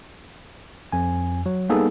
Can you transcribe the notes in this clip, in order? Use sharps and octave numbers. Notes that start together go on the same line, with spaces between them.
F2 G#5
F#3
G3 A#3 B3 D#4 G#4 A4